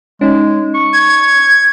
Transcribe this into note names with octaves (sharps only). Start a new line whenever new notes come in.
G#3 C#4 D#4
C#6
G#6